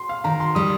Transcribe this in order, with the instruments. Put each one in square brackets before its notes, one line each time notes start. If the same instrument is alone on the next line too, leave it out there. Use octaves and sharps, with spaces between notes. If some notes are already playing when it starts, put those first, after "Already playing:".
Already playing: [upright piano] C6
F5
[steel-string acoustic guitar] D#3 [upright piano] A#5
[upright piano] C6
[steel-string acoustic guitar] G3 [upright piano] D#6